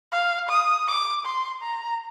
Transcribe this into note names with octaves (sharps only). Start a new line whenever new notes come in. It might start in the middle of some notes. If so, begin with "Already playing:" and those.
F5
D#6
D6
C6
A#5